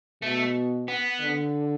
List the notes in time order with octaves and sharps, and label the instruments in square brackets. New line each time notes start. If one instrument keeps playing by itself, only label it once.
[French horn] B2 [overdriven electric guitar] A3
[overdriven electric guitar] B3
[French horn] D3